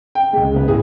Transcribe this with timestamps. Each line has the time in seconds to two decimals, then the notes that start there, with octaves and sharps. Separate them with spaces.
0.15 G5
0.33 C#2 G#3
0.54 B3 B4
0.68 A2 G#4